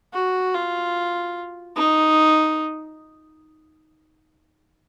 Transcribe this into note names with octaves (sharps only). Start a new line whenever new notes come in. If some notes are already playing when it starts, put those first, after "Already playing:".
F#4
F4
D#4